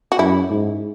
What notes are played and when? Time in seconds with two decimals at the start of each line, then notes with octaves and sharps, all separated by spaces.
0.12 F#4
0.19 F#2 E4
0.50 G#2